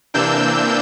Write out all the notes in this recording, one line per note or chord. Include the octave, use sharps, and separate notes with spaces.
C3 E3 A#3 D4 E6 G6